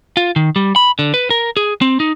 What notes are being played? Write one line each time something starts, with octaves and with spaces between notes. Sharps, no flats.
F4
D#3
G3
B5
D3
B4
A#4
G#4
C4
D#4